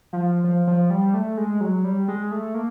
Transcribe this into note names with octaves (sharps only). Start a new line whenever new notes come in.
F3
F3
F3
G3
A3
G#3
F#3
G3
G#3
A3
A#3